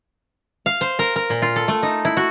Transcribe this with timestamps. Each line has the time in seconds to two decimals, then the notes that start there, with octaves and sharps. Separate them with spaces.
0.66 F5
0.81 C5
0.99 A#4
1.16 A#4
1.30 A#2
1.42 F4
1.56 A4
1.68 A3
1.83 D#4
2.05 E4
2.17 F#4